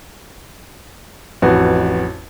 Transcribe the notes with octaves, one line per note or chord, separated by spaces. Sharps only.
A1 F2 F#4 B4